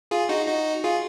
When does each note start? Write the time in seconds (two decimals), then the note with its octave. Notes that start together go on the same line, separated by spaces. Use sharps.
0.11 F4 G#4
0.29 D#4 F#4
0.48 D#4 F#4
0.84 F4 G#4